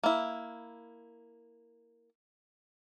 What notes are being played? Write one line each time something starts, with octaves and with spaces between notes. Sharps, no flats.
A#3 E4